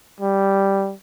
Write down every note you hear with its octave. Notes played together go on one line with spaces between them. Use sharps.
G3